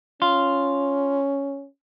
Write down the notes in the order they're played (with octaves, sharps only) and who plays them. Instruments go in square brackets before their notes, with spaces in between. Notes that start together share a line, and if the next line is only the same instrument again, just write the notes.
[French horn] C#4 [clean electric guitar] F4